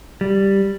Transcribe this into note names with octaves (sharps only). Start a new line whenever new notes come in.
G3